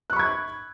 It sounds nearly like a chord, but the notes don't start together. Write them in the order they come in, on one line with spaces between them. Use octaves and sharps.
F#6 C#6 B5 G#6